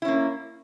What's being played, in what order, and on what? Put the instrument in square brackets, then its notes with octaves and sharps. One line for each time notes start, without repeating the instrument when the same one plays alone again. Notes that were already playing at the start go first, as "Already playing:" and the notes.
[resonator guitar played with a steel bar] E4
C#4
A#3